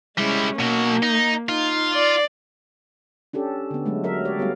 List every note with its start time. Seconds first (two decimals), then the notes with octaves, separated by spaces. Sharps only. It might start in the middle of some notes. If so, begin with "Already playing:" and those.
0.18 G3 G#3 C#4 E4
0.60 B2 F#3 A#3
1.03 D#4
1.49 D#4 F4
1.93 D5
3.33 C#4 D4 G4 A4
3.71 D3 B3
3.86 F#3 G#3 A3
4.04 F#3 A#4 E5
4.25 G4 C#5 D5
4.39 G3 B3 F#4 F5